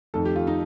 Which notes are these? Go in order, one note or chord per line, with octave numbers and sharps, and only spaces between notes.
F2 D#3 A3 A4
G4
F4
D#4